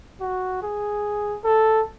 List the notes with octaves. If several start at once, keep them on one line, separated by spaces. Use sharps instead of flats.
F#4
G#4
A4